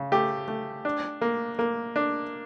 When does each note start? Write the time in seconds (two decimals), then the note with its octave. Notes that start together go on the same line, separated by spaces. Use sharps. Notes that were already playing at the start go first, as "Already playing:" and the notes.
Already playing: C#3
0.12 A3 G4
0.48 A3
0.85 D4
1.21 A#3
1.59 A#3
1.96 D4